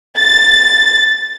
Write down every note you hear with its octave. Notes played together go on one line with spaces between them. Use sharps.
A6